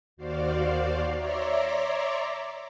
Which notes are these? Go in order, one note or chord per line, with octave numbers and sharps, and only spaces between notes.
D#2 F#4 C5 D5 F5
C#5 D5 E5 A#5 C6 D6